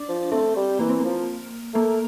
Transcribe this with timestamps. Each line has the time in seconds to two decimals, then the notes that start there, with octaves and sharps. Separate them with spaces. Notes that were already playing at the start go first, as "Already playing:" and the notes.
Already playing: D4
0.09 F3
0.32 A3 C4
0.56 G3
0.79 E3 A#3
0.89 C4
1.00 F3 A#3
1.74 A3 A#3